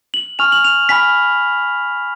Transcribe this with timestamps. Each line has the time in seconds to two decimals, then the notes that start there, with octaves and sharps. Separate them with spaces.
0.14 F#7
0.39 G#5 C#6 F6 F7
0.52 F#7
0.64 F7
0.89 G#5 B5 F6 B6